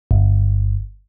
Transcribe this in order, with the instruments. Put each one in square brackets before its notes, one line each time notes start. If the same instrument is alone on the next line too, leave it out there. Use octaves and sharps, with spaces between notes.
[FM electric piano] G1